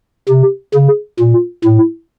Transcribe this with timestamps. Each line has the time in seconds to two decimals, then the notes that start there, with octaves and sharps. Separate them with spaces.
0.29 C3
0.74 C#3
1.19 A#2
1.64 A2